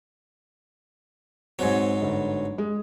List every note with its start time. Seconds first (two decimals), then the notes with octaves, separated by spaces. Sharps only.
1.59 G#2 F#3 C4 G#6
2.02 G1
2.58 G#3